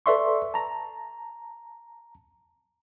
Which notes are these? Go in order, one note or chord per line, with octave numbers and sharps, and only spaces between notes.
A4 B4 D5 E5 C6 C#6
A5 A#5